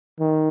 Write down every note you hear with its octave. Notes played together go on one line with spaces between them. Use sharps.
D#3